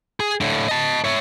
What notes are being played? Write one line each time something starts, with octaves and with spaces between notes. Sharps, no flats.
G#4
A2 D3
D#5 A5
C#5 E5